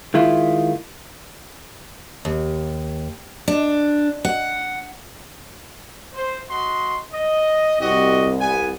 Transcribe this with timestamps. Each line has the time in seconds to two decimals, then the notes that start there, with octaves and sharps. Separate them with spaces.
0.14 D#3 G#3 E4 F4
2.25 D#2
3.48 D4
4.25 F#5
6.14 C5
6.49 F#4 D#5 C6
7.12 D#5
7.80 C2 F#4 G4 D#5
8.39 B3 G#5